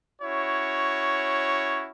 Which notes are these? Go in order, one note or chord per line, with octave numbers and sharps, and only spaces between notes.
C#4 E4 F#4 C#5